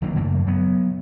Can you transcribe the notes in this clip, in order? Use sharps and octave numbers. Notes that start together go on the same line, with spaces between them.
D#3 F#3 A#3 C4
F#2 C#3 A3 A#3
F#3 B3